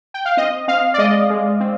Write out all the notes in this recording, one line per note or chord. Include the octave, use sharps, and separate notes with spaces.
G5
F5
C4 D#5
C4 F5
D5
G#3 D#5
G#3
C4